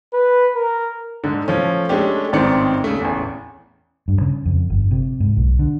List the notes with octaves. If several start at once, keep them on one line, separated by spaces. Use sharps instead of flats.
B4
A#4
G#2 D3
F3 A3 C#4
G#3 A3 C#4 D4 G4
A1 G#2 D#3 C4 D5 C#7
C#3 A3
A1 E2
G2
C#3
F2
G1
C3
G#2
B1
D3